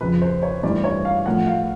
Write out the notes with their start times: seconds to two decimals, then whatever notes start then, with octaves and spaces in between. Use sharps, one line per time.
0.01 F2 C#3 F3 B4
0.22 C5
0.43 C#5
0.63 G2 E3 A3 C#4 E4 D5
0.84 C#5
1.05 F5
1.26 A2 F3 A3 F#5
1.46 F5